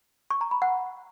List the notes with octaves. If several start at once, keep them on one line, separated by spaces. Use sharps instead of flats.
C#6
A#5
B5
F#5